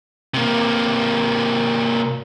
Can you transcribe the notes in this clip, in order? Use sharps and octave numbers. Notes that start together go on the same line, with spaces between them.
C3 A#3